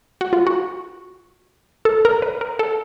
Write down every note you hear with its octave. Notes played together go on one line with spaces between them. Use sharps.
F#4
F4
F#4
A4
A#4
B4
A#4
A4